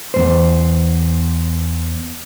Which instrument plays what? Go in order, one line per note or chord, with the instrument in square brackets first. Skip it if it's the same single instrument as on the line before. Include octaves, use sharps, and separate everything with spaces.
[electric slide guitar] E2 G2 C5